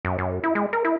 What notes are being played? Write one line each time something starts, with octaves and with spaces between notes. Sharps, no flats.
F#2
F#2
E4
G#3
A#4
E4